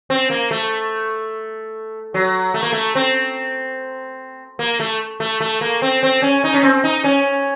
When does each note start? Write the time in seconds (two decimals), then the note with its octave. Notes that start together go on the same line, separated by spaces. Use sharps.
0.10 C4
0.30 A#3
0.51 A3
2.14 F#3
2.54 A3
2.63 A#3
2.72 A3
2.95 C4
4.59 A#3
4.80 A3
5.20 A3
5.40 A3
5.61 A#3
5.82 C4
6.03 C4
6.22 C#4
6.44 D#4
6.54 C#4
6.63 C4
6.84 D#4
7.04 C#4